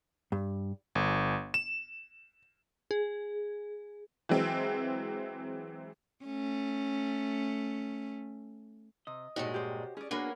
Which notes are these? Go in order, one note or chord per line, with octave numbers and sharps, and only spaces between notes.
G2
G1
E7
G#4
E3 F#3 G#3 C4
A3 C#4
C3 D#5
G2 A#2 G#3 D#4 F#4 C#5
G4 C5
C#4 G#4 D5
A#3 B3 D4 F#4 G#4 A#4 C#5 F#5